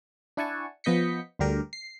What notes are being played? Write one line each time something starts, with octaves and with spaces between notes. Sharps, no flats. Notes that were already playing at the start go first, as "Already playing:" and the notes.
D4 E4 F#5 G#5 A5 C#6
F3 B3 D#5 G6 B6 C#7
D2 G2 D3 G4 A#4
C7